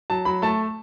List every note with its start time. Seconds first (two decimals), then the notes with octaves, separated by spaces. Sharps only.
0.10 F#3 A5
0.25 F#3 B5
0.42 A3 A5